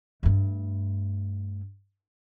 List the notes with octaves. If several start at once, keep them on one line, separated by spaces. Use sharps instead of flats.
G2 A3